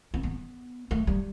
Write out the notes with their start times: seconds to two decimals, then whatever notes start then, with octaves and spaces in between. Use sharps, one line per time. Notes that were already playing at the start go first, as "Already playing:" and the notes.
0.14 C4
0.23 B3
0.91 A3
1.07 G3